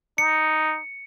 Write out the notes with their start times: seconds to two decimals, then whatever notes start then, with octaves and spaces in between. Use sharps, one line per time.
0.18 D#4 C#7